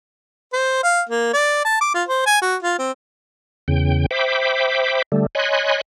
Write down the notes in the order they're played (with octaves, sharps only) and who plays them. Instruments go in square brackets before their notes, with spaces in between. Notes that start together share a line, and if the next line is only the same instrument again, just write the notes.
[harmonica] C5
F5
A#3
D5
A5
D6
F4
C5
G#5
F#4
F4
C4
[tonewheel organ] E2 C#3 G5
C5 E5 G5 B5 D6
D3 G3 A3
C#5 D#5 G#5 B5 C6 F#6